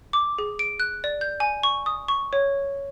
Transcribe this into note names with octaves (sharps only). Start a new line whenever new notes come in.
D6
G#4
D7
F#6
D5
G6
G#5
C#6
D#6
C#6
C#5